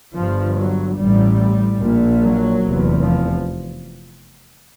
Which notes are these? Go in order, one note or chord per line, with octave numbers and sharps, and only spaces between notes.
G1 G2 F3
F#3
A1 A2 G3
A#1 A#2
F#3
F1 E2 C3
F3